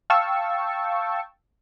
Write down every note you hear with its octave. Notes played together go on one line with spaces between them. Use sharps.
F5 G5 A5 C#6 E6